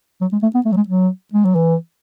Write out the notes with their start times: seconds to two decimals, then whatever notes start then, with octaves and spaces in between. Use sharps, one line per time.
0.21 F#3
0.32 G#3
0.42 A3
0.55 B3
0.66 A3
0.72 F#3
0.76 G#3
0.88 F#3
1.33 G#3
1.45 F#3
1.55 E3